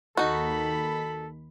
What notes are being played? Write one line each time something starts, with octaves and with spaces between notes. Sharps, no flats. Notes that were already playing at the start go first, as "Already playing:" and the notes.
D#2 D#3 D#4 F#4 A4 B5